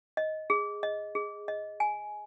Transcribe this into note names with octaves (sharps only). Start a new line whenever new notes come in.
D#5
G#4
D#5
G#4
D#5
G#5